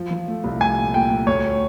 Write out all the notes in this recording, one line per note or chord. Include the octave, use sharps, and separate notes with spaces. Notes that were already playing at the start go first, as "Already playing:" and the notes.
Already playing: F3
F3
A3
C2
A3 G#5
A#2
A#2 G5
A3
D2 C#5